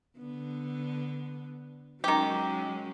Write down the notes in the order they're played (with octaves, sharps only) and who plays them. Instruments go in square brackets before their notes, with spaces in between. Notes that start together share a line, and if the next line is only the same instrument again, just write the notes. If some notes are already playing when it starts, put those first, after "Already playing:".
[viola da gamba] D3 B3
[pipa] D#3 G4 [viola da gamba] F#3 G#3 C#4